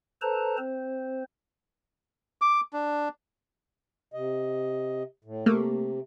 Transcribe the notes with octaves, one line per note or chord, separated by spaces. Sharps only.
A4 B4 C5 A5 A#5
C4 C5
D6
D4
C3 D#5
A2
C3 A3 A#3